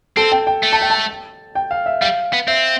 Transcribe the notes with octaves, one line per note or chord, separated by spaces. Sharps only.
C4 A4
G5
G5
A3
A5
G5
A5
G5
F5
E5
G3 F5
B3
C4 E5